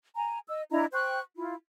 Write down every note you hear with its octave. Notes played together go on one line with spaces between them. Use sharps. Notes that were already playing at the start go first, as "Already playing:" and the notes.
G#5 A#5
D#5 E6
D4 E4 D#5 A#5
C5 G5 C#6 F#6
E4 F4